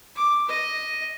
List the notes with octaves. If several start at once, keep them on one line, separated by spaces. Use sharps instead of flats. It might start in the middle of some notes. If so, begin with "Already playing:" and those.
D6
D#5